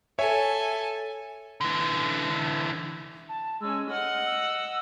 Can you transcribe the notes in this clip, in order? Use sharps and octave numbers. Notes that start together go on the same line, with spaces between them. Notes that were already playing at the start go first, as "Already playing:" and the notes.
A4 C#5 E5 G#5
D3 E3
A5
G#3 C#4 E6
D#5 F#5 F6
E6